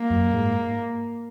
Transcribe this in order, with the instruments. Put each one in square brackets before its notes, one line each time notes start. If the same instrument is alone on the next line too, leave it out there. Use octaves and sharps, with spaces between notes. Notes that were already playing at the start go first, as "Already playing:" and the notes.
Already playing: [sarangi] A#3
[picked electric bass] F#2
G#2